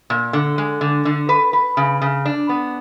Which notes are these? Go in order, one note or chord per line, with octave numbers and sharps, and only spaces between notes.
A#2
D3
G#3
D3
D3
B4
B4
C#3
C#3
D4
B3